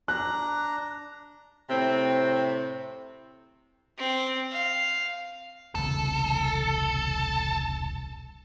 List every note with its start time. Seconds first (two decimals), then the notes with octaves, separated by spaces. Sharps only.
0.08 D4 A#5 F#6
1.70 A2 C3 C4
3.98 C4
4.52 F5
5.75 E1 C2 C#3 A4